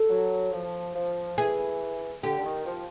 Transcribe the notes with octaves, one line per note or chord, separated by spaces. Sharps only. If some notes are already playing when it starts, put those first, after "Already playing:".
Already playing: A4
F#3
F3
F3
E3 G#4
D3 G4
D3
D#3
F3